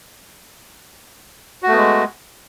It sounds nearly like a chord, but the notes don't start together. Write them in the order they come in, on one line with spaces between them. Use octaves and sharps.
F#4 A3 B3 G#3